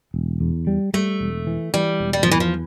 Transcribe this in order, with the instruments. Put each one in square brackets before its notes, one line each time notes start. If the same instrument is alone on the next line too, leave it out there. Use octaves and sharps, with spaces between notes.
[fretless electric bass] E1
E2
G3
[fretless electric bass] G3 [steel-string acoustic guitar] A3
[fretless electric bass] E1
E3
[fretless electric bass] E3 [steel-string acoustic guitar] G3
[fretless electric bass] E1
[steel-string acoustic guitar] G3
F3
[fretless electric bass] E2 [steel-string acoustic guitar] E3
[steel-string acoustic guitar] F3